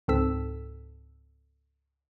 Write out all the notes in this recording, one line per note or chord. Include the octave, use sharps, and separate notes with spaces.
C#2 G#2 C4 A4 E6 B6